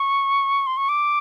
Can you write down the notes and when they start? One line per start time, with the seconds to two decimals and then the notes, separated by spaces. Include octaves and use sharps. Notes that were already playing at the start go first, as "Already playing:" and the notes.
Already playing: C#6
0.67 C6
0.77 C#6
0.89 D6